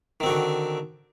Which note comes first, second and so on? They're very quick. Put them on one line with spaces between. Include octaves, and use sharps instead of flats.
D#3 C4 F#4 D3